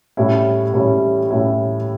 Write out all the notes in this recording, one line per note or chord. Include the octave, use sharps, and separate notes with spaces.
A2 G3 C#4 E4
A2 G3 C#4 E4
A2 G3 C#4 E4